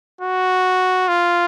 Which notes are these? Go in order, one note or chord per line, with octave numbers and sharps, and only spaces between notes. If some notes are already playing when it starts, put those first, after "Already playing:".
F#4
F4